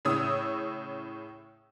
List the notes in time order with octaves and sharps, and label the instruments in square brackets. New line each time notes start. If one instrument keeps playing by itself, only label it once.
[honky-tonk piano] A2 C#3 C#5 D#6 E6